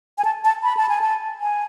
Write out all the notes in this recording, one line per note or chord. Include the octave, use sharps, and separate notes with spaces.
G#5
A5
A5
B5
A5
G#5
A5
G#5